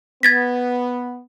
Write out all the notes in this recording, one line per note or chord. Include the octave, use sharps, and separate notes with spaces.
B3 G#6 A6 B6